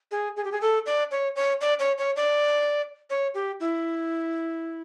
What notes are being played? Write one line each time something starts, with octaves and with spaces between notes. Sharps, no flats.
G#4
G#4
G4
G#4
A4
D5
C#5
C#5
D5
C#5
C#5
D5
C#5
G4
E4